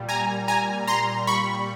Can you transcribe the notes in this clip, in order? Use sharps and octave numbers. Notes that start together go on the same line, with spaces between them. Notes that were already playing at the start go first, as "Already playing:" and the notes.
Already playing: A#2 G3
G#5 A#5
G#5 A#5
A#5 C6
B5 C#6